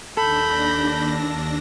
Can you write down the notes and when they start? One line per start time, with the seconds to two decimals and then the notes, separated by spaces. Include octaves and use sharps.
0.17 D#2 D4 A4 B5 G6 A#6